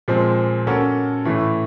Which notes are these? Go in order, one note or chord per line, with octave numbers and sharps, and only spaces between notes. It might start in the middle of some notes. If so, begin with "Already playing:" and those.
A#2 F3 G#3 C4
A#3 C#4 F#4 A4
A2 E3 A3